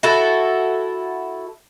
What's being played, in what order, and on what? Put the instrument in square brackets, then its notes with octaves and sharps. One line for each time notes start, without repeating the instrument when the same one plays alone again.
[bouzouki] E4 F#4 A4